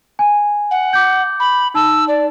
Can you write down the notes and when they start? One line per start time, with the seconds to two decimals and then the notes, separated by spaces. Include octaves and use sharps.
0.19 G#5
0.70 F#5
0.93 D6 G6
1.39 B5
1.74 D#4 A5 E6
2.08 D5